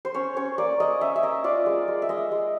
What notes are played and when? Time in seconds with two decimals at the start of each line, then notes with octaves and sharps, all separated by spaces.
0.05 C5
0.14 C#4 C#5
0.36 C#4 C#5
0.58 A#3 D5
0.80 A#3 D#5
1.01 C#4 E5
1.16 E5
1.23 A#3 D#5
1.44 F4 D5
1.66 G#3
1.88 G#3
2.02 E5
2.09 G#3 D#5
2.31 G#3